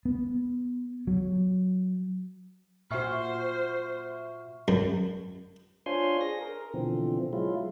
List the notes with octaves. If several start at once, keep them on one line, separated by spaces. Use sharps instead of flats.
B3
F#3
A#2 F#4 C5 E5 C#6 F6
F#2
D4 F4 C5 C#5 G#5 C6
G#4 A#6
A#4
B2 D3 E3 F3 C4
F#3 G#3 E4 F4